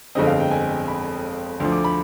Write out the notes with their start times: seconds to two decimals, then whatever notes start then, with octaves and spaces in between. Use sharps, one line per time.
0.15 G1 F2 D3 G#3 C4 D#5
0.27 F5
0.40 G5
0.51 G#5
0.88 B5
1.60 D2 D3 F3 C6
1.72 D6
1.84 B5